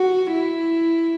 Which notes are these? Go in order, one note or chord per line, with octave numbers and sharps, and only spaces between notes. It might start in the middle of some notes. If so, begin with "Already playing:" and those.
Already playing: F#4
E4